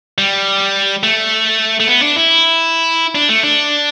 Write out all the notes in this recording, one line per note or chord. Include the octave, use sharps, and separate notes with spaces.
G3
A3
A3
B3
D4
E4
D4
A3
D4